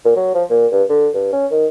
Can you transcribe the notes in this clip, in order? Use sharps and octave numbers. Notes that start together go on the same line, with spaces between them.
A#2
F#3
F3
A#2
G2
D3
G2
C#4
D#3